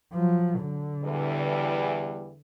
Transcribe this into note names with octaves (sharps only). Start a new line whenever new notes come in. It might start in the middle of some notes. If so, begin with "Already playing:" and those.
F3 F#3
D3
E2 E3 G3